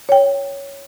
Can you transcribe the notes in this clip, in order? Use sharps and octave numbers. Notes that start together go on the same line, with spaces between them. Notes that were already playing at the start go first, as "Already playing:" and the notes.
C#5 G5